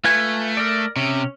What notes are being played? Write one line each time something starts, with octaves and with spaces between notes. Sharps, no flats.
A3 F4 B4 G#5
A#4 D5
C3 C#4